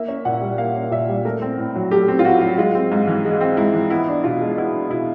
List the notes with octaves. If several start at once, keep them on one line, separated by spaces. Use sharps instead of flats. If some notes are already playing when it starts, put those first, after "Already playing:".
Already playing: A#3 E5
C#4
A#2 F#5
G3
A#3 F5
C#4
A#2 E5
G3
A3 A#4
C4
A2
F#3
A3 G4
C4
F4
A2 F#4
F#3
G#3 F4
C4
G#2
E3
G#3
C4
G#2 E4
E3
B3 E4
D4
B2 F4
G#3
B3 E4
D4
B2 E4